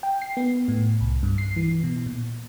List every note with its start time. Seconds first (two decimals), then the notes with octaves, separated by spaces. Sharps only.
0.03 G5
0.22 C7
0.37 B3
0.68 A2
1.01 C2
1.23 G2
1.38 C7
1.56 E3
1.83 B2
2.06 A#2